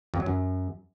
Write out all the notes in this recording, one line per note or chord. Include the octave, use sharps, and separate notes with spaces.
F2
F#3
F#2